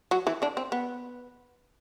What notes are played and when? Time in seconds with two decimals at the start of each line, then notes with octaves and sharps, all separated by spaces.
0.11 F#3 F#4
0.27 E3 E4
0.42 D3 D4
0.57 C4
0.72 B3